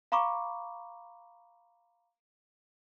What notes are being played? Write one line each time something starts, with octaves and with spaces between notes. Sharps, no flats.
F5 A#5 B5 C#6 D6